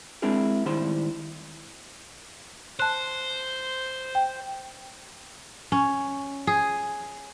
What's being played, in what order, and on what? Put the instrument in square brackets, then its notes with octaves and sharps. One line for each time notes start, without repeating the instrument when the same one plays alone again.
[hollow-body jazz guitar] G#3 C4 D4 E4 G#4 A#4
A2 D#3 G3 E4 C5 C6
[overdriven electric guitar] C5 [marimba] A5 F#6
[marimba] G5
[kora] C#4
G#4